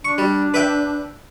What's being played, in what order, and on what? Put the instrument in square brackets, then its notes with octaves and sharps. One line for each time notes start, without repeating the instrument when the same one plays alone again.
[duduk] D4 [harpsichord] C#6
[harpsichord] G3
B4 E5 G5